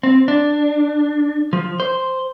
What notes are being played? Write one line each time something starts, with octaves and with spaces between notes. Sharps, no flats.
C4
D4
F3
C5